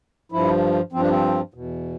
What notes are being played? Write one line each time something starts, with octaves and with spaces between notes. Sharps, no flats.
G2 F3 E4
G2 F3 C4
D4
C4
E2 B2